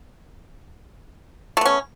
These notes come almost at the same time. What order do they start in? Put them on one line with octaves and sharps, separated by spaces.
A3 B3 C#4